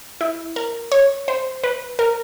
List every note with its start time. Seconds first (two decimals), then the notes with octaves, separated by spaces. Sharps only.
0.21 E4
0.56 A#4
0.92 C#5
1.28 C5
1.64 B4
1.99 A#4